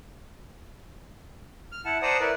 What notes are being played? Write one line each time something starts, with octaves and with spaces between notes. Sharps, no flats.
F6
E4 F#5 A5
C5 D5 F#5 A5 A#5 D#6
E4 A#4 B4 D5